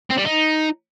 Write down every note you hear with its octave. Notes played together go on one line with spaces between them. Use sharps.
C4
G3
D#4